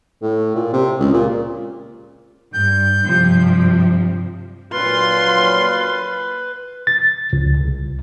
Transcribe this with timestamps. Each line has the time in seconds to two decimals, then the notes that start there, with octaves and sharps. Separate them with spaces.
0.22 A2
0.55 A#2
0.73 C3
1.00 C#2
1.13 A#2
2.53 G2 G6
3.03 G2 C3 F3
4.73 A#2 F#3 F4 B4 C6
6.87 A6
7.33 C#2
7.61 C2